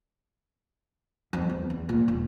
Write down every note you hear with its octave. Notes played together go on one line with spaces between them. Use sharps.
F2
E2
E2
A#2
E1